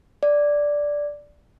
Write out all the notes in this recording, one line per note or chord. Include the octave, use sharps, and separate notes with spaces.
D5